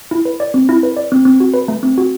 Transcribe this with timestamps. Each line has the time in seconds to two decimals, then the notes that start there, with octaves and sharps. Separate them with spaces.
0.11 E4
0.25 B4
0.40 D5
0.54 C4
0.69 E4
0.83 B4
0.97 D5
1.12 C4
1.25 C4
1.40 F#4
1.54 B4
1.68 A3
1.83 C4
1.98 F#4